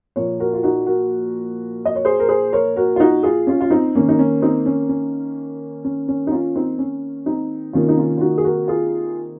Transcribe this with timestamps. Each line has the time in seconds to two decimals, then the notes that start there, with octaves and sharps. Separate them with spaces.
0.16 A#2 F3 A#3 A#4 C#5
0.40 F#4 A#4
0.53 F4
0.63 D#4 F#4
0.86 F#4 A#4
1.85 D#5
1.96 C#5
2.05 G#4 C5
2.20 A#4
2.29 G#4 C5
2.52 A#4 C#5
2.76 F#4 A#4
2.96 F4
3.00 D#4 F#4
3.23 F4 G#4
3.47 C#4 F4
3.61 F4
3.71 C4 D#4
3.95 D#3 A#3 C#4
4.09 D#4
4.19 C#4
4.42 C4 D#4
4.66 C#4
4.89 C#4
5.84 C#4
6.08 C#4
6.27 D#4
6.32 C#4 F4
6.56 C4 D#4
6.78 C#4
7.26 C4 D#4
7.73 C3 D#3 A#3 C#4 F4
7.89 D#4
7.98 C#4 F4
8.18 F4
8.21 D#4 F#4
8.38 G#4
8.44 F#4 A#4
8.68 F4 G#4